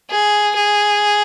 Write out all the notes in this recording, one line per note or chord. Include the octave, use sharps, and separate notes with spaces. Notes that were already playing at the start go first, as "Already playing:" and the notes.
G#4
G#4